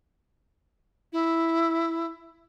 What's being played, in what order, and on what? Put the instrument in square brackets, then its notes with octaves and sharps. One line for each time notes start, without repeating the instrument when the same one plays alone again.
[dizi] E4